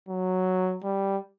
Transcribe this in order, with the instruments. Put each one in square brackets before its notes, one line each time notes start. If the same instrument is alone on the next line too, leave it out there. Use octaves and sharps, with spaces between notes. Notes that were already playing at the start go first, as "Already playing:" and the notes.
[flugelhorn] F#3
G3